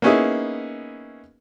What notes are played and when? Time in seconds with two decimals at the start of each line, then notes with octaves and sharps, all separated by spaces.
0.02 A#3 B3 C#4 D#4 E4 G#4